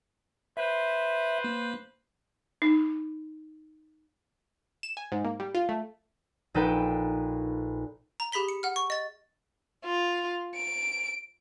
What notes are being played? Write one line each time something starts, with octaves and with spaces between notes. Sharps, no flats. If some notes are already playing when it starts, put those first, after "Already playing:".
B4 C5 E5
A#3
D#4
E7
G#5
G#2
A#3
G3
F4
A3
A#1 D#4 A4 B4 G5
A#5
G4 G#4 B5 B6 G7
C#7
F#5 F6
C#6
D#5 A6
F4
D7